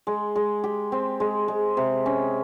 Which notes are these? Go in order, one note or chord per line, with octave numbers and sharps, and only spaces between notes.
G#3
G#3
G4
C4
G#3
G#3
C3
C#4